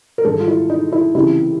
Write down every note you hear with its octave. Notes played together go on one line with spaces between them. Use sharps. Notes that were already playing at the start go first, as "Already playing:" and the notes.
A#4
G#2 D#3 G3 A4
F4
E4
D#4
E4
C#2 C3 E3 E4